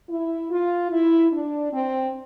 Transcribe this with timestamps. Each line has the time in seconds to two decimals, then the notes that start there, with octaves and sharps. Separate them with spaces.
0.09 E4
0.51 F4
0.91 E4
1.32 D4
1.73 C4